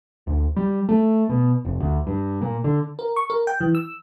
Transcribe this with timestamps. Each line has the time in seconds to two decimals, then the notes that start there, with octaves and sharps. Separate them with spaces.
0.27 D2
0.56 G3
0.89 A3
1.29 B2
1.65 F1
1.80 D2
2.07 G2
2.42 A#2
2.64 D3
2.99 A#4
3.16 C#6
3.30 A#4
3.47 G5
3.61 E3
3.75 E6